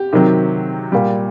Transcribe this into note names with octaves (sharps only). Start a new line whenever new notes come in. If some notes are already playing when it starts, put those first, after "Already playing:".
Already playing: G4
C3 D#3 F#3
A#2 G3